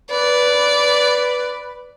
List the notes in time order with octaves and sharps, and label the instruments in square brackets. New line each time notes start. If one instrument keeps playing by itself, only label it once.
[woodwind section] B4 [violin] D5